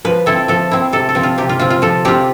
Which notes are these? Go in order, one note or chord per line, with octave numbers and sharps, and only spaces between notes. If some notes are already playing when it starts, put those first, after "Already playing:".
F3 B4
C4 E4 A4
F3 A4
C4 E4
C3 A4
A4
F3 C4
F4
C3 G4
F4
F3 C4 F4
F4
F3 A4
C4 F4 G4